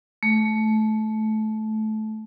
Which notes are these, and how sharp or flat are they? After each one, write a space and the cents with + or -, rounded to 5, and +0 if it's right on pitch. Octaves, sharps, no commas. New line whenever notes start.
A3 -20